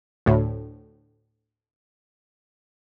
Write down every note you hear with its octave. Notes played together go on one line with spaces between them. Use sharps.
D2 A2